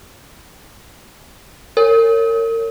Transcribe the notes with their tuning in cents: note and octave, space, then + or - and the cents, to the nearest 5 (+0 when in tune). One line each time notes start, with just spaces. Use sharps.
A#4 -35 C#5 +0